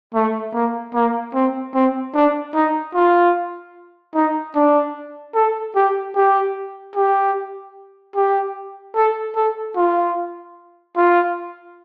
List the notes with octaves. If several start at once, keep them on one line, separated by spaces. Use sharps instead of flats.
A3
A#3
A#3
C4
C4
D4
D#4
F4
D#4
D4
A4
G4
G4
G4
G4
A4
A4
F4
F4